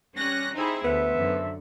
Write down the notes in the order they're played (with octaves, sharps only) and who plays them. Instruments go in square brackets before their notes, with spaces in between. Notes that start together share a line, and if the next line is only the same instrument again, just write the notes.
[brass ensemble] G3 [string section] C#4 F#6 A#6
[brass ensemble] C3 C4 [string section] D#4 E4 G#4
[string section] D2 [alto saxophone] B3 [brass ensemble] A4 C5 E5
[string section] F#2 D3